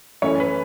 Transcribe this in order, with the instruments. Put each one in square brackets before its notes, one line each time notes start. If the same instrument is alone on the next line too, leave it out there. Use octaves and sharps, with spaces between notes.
[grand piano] F#2 E3 A3 C#4 C#5
B4